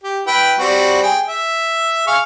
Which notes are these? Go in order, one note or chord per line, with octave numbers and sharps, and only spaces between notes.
G4
E4 B4 G5
G3 C4 F#4
G#4 G5
E5
G#4 F5 C#6